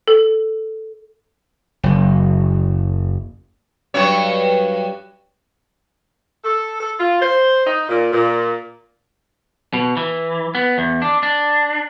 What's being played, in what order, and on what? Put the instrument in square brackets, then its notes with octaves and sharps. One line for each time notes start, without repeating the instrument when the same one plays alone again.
[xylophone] A4
[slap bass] F#1
[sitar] G2 F#3 C#5
[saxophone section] A4
A4
F4
C5
D#4
A#2
A#2
[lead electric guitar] B2
E3
B3
E2
D4
D4